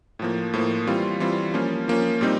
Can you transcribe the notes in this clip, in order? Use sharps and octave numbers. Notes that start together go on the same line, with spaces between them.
A2 F3 A#3
A2 F3 A#3
E3 G3 C4 F4
E3 G3 C4 F4
F3 A#3 C#4
F3 A#3 C#4
A#2 G3 C4 D#4